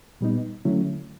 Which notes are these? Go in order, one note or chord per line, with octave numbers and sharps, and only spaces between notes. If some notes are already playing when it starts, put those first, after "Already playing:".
A#2 G3 B3 D#4
D3 F#3 A3 C#4 E4